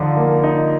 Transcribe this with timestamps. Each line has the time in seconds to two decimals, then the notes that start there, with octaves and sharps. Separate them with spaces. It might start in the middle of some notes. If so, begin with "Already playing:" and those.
Already playing: D3 F3 D#4
0.17 A#3
0.43 D#4